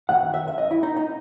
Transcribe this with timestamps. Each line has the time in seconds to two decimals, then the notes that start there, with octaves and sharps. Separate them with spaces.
0.09 F#2 D#3 F#5
0.34 E5
0.48 E5
0.58 D#5
0.71 E4
0.83 D#4
0.97 D#4